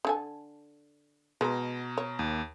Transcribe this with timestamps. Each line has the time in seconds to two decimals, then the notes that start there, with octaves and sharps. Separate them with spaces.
0.05 D3 A4 G#5
1.41 B2 G#3 B3 A#5
1.98 C#5
2.19 D#2